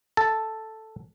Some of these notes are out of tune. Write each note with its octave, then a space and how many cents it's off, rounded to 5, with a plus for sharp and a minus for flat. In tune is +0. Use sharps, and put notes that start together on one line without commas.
A4 +0 A5 +0